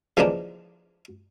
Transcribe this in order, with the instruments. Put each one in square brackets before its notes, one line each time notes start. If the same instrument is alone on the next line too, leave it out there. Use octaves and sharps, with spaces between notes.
[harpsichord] C#3 E3 F3 G#3 A#3 D4